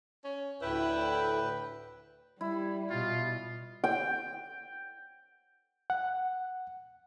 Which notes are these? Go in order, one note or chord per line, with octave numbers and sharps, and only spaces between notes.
C#4
D2 A2 E4 B4 G5
G3 E4
B2 F4
G5
F#5